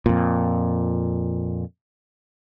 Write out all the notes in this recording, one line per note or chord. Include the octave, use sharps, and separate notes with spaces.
F2 A#2